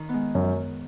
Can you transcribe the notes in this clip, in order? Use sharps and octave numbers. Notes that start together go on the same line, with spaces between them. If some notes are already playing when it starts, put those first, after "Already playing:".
Already playing: D#3
G#3 B3
F#2